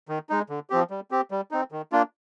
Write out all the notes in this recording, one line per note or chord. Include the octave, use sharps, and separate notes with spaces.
D#3
G#3 D#4
D3
F3 C4 G4
G3
C4 G4
G3
C4 D#4
D#3
A#3 D4 F4